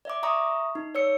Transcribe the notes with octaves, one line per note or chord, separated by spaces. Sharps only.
D5 E5 D6
E5 A#5 C#6 D#6
D#4
C#5 D5 E6 C#7